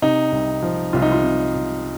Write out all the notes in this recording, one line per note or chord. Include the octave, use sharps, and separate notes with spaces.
C3 D#4
C2
F3
C2 F4
D#4
F4
C3
C2